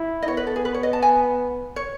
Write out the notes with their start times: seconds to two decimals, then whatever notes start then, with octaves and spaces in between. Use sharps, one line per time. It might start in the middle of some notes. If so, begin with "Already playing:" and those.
Already playing: E4
0.22 D#5
0.27 B3 C#5
0.37 B4
0.47 A4
0.56 G#4
0.65 B4
0.74 C#5
0.83 D#5
0.93 A5
1.02 G#5
1.76 C#5